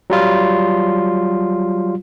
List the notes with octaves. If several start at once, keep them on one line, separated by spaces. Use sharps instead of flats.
F#3 G3 F4